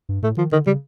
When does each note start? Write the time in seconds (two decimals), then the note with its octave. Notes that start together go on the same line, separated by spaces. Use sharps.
0.09 G2
0.22 A2 A3
0.37 D#3 F3
0.52 D3 D#3
0.66 C#3 G3